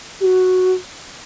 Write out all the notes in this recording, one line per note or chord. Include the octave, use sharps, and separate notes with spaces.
G4
F#4